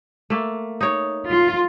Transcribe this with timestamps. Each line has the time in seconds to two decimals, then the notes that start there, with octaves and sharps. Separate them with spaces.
0.30 A3 A#3
0.81 D#4 C#5
1.30 F4